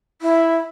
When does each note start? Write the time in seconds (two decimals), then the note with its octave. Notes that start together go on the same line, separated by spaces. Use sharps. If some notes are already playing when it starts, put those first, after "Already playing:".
0.22 E4